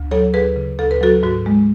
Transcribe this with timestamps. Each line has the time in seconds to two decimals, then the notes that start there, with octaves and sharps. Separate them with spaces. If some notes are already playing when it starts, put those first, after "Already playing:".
Already playing: D2
0.11 F#3 A4 C#5
0.34 D2 G#4 B4
0.56 C#3
0.78 D2 A4
0.91 B4
1.01 F#3 F#4 A4
1.23 G#2 F#4
1.46 G#3